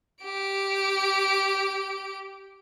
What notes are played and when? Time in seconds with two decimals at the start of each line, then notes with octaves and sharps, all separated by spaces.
0.24 G4 D7